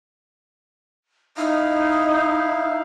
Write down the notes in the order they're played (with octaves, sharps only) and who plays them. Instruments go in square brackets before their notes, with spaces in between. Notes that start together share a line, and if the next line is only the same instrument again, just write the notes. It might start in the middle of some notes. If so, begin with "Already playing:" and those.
[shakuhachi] D#4 [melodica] E4 F5